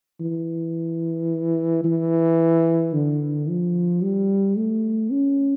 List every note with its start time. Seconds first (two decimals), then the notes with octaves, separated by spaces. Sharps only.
0.21 E3
1.84 E3
2.93 D3
3.48 F3
4.02 G3
4.56 A3
5.11 C#4